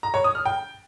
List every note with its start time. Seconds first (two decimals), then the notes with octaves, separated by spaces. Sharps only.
0.03 A#5
0.14 C#5
0.24 D#6
0.35 F6
0.46 G5